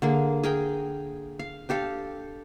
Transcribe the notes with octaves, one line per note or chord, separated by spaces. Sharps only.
D3 A#3 G#4
G#4 A#4 G5
F5
D4 G4 A4 F5